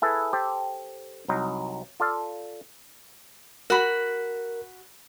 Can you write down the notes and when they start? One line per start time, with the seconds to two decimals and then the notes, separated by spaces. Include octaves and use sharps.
0.02 E4 G#4 A4 B4
0.33 G4 A4 C5
1.28 C2 F#3 D#4
2.00 F4 A4 D5 F5
3.70 F#4 A#4 B5